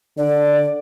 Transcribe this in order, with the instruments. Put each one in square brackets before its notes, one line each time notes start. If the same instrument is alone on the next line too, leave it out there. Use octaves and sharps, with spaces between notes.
[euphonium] D3 [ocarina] D5